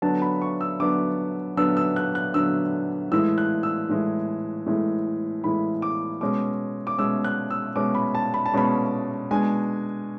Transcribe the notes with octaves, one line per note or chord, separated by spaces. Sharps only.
D3 F#3 B3 D4 A5
B5
C#6
E6
D3 F#3 B3 D4 D6
D3 F#3 B3 D4 E6
E6
F#6
F#6
D3 F#3 B3 D4 E6
A2 E3 G#3 E6
F#6
E6
A2 E3 G#3
A2 E3 G#3
A2 E3 G#3 B5
D6
B2 G#3 C#4 D6
D6
B2 G#3 C#4 E6
F#6
E6
B2 G#3 C#4 D6
B5
A5
B5
A5
B2 G#3 C#4 B5
B2 G#3 D4 G#5